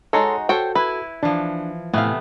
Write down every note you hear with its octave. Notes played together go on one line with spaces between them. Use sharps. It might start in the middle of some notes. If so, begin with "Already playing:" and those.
G#3 D#4 F#4 A4 C#5 C6
F#4 A4 C5 C#5 G5
E4 B4 G#5
E3 F3 D4
A2 C3 A3 B3 F5 G#5